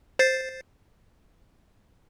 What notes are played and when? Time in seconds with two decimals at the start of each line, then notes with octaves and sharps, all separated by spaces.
0.19 C5 A6 C7